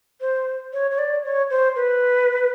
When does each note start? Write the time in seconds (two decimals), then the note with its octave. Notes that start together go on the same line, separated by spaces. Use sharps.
0.21 C5
0.73 C#5
0.91 C#5
0.98 D5
1.25 C#5
1.50 C5
1.76 B4